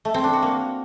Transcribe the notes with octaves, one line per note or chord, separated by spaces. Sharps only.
A3
C4
D4
F#4
A#3